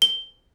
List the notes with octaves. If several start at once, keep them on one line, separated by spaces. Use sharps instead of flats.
G7